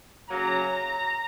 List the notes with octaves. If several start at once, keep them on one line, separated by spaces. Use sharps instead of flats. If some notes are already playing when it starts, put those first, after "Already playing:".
C#3 F#3 A#3 A#5